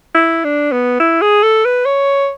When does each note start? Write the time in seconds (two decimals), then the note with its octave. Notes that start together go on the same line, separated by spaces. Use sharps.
0.15 E4
0.44 D4
0.72 B3
1.00 E4
1.21 G#4
1.43 A4
1.65 B4
1.86 C#5